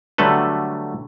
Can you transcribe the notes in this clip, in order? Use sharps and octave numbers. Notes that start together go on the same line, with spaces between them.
D3 F#3 G3 A3 A4 B4